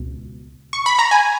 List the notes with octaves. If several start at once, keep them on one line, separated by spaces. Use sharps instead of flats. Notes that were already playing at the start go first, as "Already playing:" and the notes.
Already playing: C#2 B2
C#6
B5
A#5
G#5